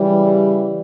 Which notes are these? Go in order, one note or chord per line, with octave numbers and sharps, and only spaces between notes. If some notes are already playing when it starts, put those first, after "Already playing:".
Already playing: C#3 E3 G3